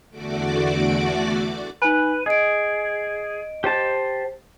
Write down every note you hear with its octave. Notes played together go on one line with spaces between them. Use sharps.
E2 D3 A3 F#4 D5 D6
D#4 B4 G#5
G#4 D#5 D7
G4 C5 A5